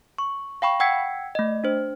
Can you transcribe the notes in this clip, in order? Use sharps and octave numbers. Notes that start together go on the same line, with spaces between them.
C#6
F5 G5 B5 C#6
F#5 G5 E6 G#6 B6 C#7
A3 D#5
D4 C5